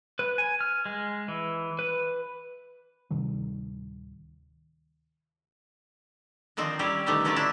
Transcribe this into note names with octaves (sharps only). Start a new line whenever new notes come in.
B4
G#5
F6
G#3
E3
B4
D1 C3 D#3 G3
D3 D#3 F3 C4 D#4
G3 C#4 E4 G4 D5
B2 D3 D#3 G3 A3 G4
D3 F#3 C#4 F4 D5 E5
D4 E4